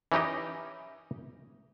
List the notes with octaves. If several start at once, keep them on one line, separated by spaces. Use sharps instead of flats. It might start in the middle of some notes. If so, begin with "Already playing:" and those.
E3 C#4 D#4 G4 D#5